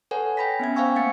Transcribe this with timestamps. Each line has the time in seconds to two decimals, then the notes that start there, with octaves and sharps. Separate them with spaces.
0.11 A4 B4 C#5 F#5 G#5
0.37 G5 G#5 B5 A#6 B6
0.60 B3 C#4 E5 G#6
0.76 C5 F5 G5 G#5 C#6 E6
0.95 A3 A#3 F#5 G#6 A6 C#7